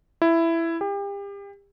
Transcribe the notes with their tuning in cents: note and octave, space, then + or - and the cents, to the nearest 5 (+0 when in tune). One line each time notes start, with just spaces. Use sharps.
E4 +10
G4 +35